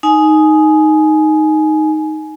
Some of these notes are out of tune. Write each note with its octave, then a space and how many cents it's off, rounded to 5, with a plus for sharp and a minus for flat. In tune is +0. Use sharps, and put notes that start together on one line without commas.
D#4 +0 G#5 +20